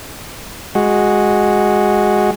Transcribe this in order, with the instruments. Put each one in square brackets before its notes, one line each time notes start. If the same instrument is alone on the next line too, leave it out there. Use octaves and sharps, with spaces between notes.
[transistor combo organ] G#3 F#4